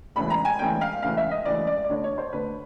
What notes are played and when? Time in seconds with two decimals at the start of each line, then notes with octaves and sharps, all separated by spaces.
0.16 E1 D2 C#3 E3 B5
0.30 A#5
0.45 G#5
0.59 E1 D2 C#3 E3 G5
0.81 F5
1.02 E1 D2 C#3 E3 F5
1.17 E5
1.31 D#5
1.45 E1 D2 C#3 E3 D5
1.67 D5
1.84 D5
1.89 D2 D3 C#5
2.04 C#5
2.18 C5
2.33 D2 D3 B4